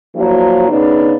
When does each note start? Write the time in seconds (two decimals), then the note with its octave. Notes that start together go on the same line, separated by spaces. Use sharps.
0.15 F3 F#3 A#3 D4 E4
0.69 C#3 B3 D4 D#4